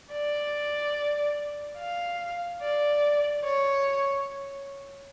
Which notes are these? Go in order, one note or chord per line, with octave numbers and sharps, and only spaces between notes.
D5
F5
D5
C#5